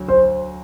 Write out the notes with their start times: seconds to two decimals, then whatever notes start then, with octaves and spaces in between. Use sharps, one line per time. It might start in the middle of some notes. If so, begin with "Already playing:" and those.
Already playing: D2 F#3
0.08 C5